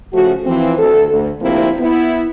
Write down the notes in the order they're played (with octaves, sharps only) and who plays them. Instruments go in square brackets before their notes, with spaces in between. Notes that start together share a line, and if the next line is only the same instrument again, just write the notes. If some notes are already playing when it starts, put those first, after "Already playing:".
[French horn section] C#3 F3 A3 F#4
E3 F3 C4
D2 A4
D2
D2 C3 F3 A#3 C4 E4
B3 E4